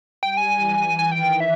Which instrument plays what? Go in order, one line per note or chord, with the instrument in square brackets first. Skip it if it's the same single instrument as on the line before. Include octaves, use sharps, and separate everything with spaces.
[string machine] G3 [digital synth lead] G5
[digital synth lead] G#5
[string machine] E3
[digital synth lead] G#5
[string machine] D#3 [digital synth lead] G5
[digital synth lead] E5